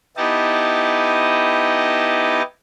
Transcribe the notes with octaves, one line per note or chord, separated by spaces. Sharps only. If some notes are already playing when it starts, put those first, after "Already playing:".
B3 D#4 E4 G4 D#5 A5